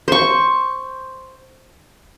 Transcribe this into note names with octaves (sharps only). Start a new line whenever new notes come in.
C5 C#6